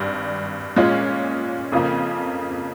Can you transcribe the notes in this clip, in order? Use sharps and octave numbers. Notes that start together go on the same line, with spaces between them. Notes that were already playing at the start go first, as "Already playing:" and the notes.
Already playing: G#1 G2 G3
A#2 G#3 C#4 F4
F2 C#3 F3 A#3